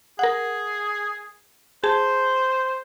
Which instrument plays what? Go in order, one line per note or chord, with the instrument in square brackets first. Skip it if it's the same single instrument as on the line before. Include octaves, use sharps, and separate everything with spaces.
[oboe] G#4 [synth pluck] A#4 F#5
[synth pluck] G#4 A5 [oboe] C5